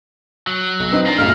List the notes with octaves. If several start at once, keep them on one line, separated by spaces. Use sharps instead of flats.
F#3
B1
C4 D#4 B4
A#3 D4 F4 A#5
B1 F#2 A2 F6